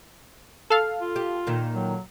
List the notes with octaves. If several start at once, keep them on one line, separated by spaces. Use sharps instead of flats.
A4 F5
F4
G4
A#2 D#3
F#3